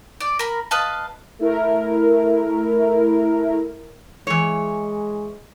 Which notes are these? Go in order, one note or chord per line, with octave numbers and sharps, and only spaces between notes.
D5
A#4 B5
B4 D#5 F5 A5
A3 E4 A#4
E3 G#3 C#5